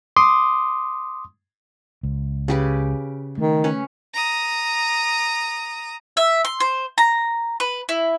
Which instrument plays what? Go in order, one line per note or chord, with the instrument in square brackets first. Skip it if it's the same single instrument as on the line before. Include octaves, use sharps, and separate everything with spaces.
[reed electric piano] C6 D6 D#6
[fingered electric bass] C#2
[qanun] C#3 G4 B4
[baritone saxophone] D#3 [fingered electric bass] A3
[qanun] C#4 B4
[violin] A#5 D#6
[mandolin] E5
C6
C5
A#5
B4
E4